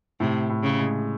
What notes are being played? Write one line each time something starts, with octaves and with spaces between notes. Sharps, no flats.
A2 C3
A2
C#3
G#3